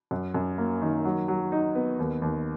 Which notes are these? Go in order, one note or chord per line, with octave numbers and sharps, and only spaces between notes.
F#2
F#2
A#3
D#3
F#3
F#3
D#4
B3
D#2
D#2